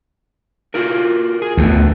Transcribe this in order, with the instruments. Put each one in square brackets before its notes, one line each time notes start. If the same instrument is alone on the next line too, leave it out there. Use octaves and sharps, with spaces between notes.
[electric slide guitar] F4 F#4 A#4
G#4
[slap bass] D2 [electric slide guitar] A2 F3 B3